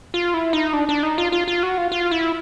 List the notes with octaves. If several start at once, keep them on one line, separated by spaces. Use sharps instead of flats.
F4
E4
D#4
D4
D4
D#4
F4
F4
F4
F#4
F4
F4
E4